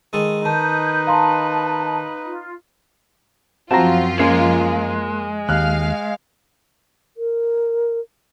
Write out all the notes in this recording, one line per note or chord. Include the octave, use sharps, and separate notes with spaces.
D#3 G#3 A4
D#3 D#4 B4 A5 G6
F5 A5 A#5 C6
F4
F#2 F3 C4 F4 F#4 A5 A#5
G#3 A#3 C#4 F5
D#2 F5 F6 F#6
A#4